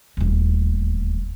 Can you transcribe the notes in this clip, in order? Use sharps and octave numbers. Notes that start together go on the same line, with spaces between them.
D#1 D2